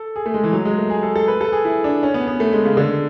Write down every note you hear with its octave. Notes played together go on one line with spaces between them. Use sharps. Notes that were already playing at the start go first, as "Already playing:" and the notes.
Already playing: A4
G#4
A3
G#3
E3
F#3
G#3
A3
G#4
A4
A4
B4
A4
G#4
E4
D4
C#4
B3
B3
A3
G#3
C#3
D3